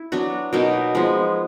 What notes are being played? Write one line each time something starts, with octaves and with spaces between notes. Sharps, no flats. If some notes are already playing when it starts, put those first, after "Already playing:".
Already playing: E4
F#3 B3 D4 F#4
B2 F#3 A#3 D#4
F3 G#3 B3